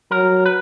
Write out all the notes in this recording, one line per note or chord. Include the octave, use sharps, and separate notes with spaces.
F#3 A#4
B4